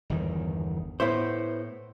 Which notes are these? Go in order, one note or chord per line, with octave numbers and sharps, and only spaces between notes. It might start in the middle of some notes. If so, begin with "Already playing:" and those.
G1 E2 D#3
A2 B3 E4 C5